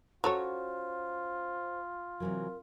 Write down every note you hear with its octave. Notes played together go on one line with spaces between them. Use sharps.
F#3 C#4 F4 F#4 A4 C5 C#5
C3 E3 F#3 A#4